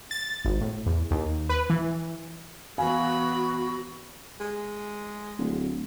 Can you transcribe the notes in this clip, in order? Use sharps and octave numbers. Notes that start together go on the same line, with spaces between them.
A6
G#1
A2
E2
D#2
B4
E3
E3 B3 F#4 F5 G#5 B5
G#3
D1